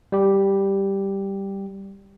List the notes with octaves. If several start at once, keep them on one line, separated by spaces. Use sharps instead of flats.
G3 G4